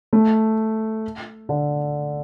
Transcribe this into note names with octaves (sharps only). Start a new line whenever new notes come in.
A3
D3